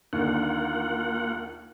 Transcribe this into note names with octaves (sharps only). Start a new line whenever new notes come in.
D#2 D3 A#3 F4 F#5